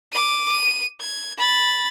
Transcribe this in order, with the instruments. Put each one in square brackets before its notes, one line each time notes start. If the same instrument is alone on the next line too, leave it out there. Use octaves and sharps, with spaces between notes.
[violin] D6 D#7
D#7
G#6
B5 A6